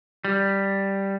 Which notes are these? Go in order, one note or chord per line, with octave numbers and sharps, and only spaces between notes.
G3